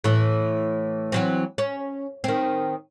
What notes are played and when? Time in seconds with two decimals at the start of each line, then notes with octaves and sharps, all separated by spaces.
0.04 A2 E3
1.12 E3 F#3 C4
1.58 C#4
2.24 D#3 C4